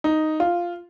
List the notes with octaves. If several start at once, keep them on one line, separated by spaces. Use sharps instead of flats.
D#4
F4